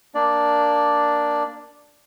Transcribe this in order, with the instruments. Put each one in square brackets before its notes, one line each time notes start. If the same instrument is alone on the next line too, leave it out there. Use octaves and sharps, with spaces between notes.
[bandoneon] A#3 D4 D5